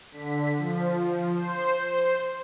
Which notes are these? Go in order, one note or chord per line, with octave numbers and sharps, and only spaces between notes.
D3 B6
F3
C5